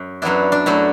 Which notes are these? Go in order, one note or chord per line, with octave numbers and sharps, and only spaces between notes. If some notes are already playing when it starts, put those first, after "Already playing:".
Already playing: F#2
F#2 F#3 B3 D4 E4
D4
F#2 F#3 A3 E4